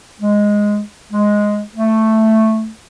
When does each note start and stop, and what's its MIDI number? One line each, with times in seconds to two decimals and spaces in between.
0.21 0.80 56
1.12 1.60 56
1.76 2.68 57